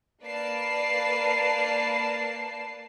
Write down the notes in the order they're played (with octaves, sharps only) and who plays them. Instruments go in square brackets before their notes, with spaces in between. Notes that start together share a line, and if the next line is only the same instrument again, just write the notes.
[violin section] A#3 B4 D5 A5 C7